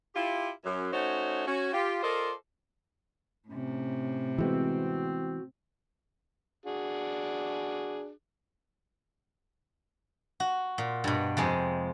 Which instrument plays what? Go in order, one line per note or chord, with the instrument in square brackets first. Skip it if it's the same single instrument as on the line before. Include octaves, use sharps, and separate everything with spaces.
[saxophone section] E4 F4 G4
F#2
A3 C#4 D#4 F#4 C5 C#5
C#4 F#4
F4 G4
F4 A4 A#4 C5 D5 D#5
[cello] A2 C3 [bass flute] C#4
[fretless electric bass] E3 G#3 B3 [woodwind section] C4 [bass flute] F#4
[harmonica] D4 F#4 G#4
[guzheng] F#4
A#2
G2 B2
F2 C3 G#3